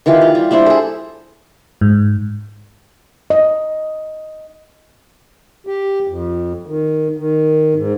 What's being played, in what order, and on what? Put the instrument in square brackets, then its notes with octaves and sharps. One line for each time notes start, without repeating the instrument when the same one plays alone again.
[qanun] D#3 E3 F4 G4
F4
G3
G3 D4 E4 C5
G#4 A4
[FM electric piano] G#2
[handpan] D#5
[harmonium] G4
F2
D#3
D#3
G#2